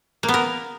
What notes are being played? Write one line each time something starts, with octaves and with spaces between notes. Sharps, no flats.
A#3
B3
A#4